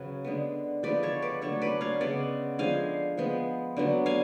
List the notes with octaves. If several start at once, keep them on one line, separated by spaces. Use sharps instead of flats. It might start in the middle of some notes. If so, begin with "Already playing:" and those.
Already playing: C#3 F#3 B4
D3 G#3 B3
F3 G#3 B3 B4 D5
A4 C#5
B4 D5
D3 F#3 A3 A4 C#5
B4 D5
C#5 F5
C#3 G#3 B3 D5 F#5
D3 F3 G#3 F5 G#5
F3 G#3 B3
D3 F#3 B3
F5 G#5